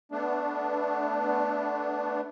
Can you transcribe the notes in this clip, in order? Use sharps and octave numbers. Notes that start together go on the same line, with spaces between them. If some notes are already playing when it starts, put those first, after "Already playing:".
A3 B3 D4